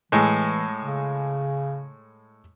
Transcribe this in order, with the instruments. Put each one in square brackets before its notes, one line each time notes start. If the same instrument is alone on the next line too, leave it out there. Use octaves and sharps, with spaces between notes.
[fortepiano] A2 G#3 [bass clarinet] E3
[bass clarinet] C#3